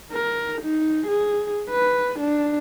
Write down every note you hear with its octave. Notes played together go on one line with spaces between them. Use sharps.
A#4
D#4
G#4
B4
D4